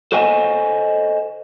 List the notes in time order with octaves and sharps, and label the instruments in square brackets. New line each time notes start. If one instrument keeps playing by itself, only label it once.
[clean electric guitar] A4 C5 C#5 D#5 G#5